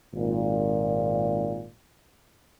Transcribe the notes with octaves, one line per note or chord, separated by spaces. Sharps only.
G#1 A#2